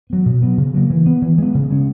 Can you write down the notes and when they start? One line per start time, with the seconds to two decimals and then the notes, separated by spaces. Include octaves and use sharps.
0.10 F#3 B3
0.26 B2
0.42 F#3 B3
0.58 C#3
0.74 F#3 A#3
0.90 E3
1.06 B3
1.22 E3
1.38 G#3 B3
1.55 C#3
1.71 G#3 C#4